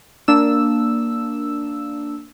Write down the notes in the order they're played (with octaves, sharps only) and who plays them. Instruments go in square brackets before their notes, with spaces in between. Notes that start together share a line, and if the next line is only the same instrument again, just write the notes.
[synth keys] A#3 D4 E6